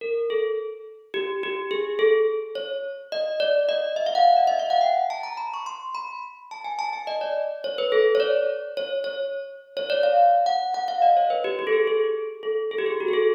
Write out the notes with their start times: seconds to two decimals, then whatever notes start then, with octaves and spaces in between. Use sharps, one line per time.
0.01 A#4
0.30 A4
1.14 G4
1.43 G4
1.71 G#4
1.99 A4
2.55 C#5
3.12 D#5
3.40 D5
3.69 D#5
3.96 E5
4.06 F5
4.15 F#5
4.36 D#5
4.47 E5
4.59 F5
4.70 F#5
4.81 G5
5.10 A5
5.23 A#5
5.37 B5
5.54 C#6
5.66 C6
5.95 B5
6.51 A5
6.64 G#5
6.79 A5
6.93 G#5
7.07 D#5
7.21 D5
7.64 C#5
7.78 B4
7.92 A4
8.15 C#5
8.20 D5
8.77 C#5
9.04 C#5
9.77 C#5
9.90 D5
10.03 F5
10.46 F#5
10.74 F#5
10.88 F5
11.02 D#5
11.17 C#5
11.30 B4
11.44 G4
11.59 G4
11.67 A4
11.73 G#4
11.87 A4
12.43 A4
12.71 A4
12.78 G4
12.86 G#4
13.00 F#4
13.08 G#4
13.13 A4